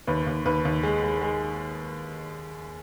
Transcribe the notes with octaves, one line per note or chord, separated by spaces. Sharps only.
D#2 B4
D#2
D#2 B4
D#2
G#3
G#3
G#3